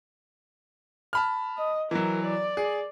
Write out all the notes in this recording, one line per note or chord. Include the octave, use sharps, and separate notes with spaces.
A5 B5 F6
D#5
E3 F#3 A#4
D5
G#4